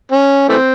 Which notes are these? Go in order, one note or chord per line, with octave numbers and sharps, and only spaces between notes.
C#4
E3 A3 C4